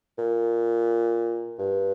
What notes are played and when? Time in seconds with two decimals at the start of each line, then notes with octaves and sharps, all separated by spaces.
0.18 A#2
1.58 G2